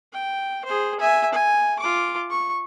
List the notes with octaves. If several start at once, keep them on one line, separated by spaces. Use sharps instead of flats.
G5
G#4 C5
E5 G#5
G#5
F4 D6
C#6